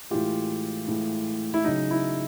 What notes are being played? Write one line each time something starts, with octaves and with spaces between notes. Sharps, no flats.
A2 E3 G#3 F4 G4
A2 E3 G#3
E4
C#3 F#3 D#4
E4